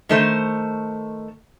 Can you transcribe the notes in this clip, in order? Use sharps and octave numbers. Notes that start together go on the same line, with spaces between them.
D#3 A3 C5